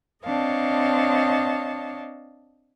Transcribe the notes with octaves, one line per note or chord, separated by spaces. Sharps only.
C4 D4 C#5 D#5 F5 A5